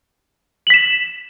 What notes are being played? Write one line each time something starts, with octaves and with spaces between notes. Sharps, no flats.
B6 E7 F#7